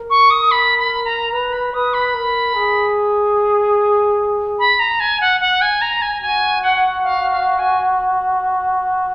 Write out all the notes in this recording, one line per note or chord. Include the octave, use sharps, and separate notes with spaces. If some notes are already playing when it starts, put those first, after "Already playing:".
Already playing: A#4
C#6
D#6
B5
B5
A#5
B4 A#5
B5
B4 D#6
B5
A#4
G#4
B5
A#5
G#5
F#5
F#5
G#5
A#5
G#5
F#4 G#5
F#5
F5
F5
G#5